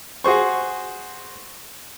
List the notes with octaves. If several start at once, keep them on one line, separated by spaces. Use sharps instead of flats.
F#4 G#4 C5 C#6